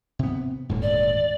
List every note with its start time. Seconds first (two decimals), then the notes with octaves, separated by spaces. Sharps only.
0.19 C3 B3
0.69 D#1 D2 G#2
0.82 D5